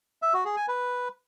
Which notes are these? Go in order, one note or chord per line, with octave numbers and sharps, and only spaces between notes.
E5
F#4
G#4
G#5
B4